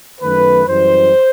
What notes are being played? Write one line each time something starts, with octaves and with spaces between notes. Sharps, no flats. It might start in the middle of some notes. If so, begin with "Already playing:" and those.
F#2 D#3 A3 B4
F#2 E3 G3 C5